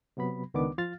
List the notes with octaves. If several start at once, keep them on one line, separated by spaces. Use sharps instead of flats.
C3 F#3 B3 B5
C#2 D#3 B3 D4 D6
F3 F4 F5 F6 A6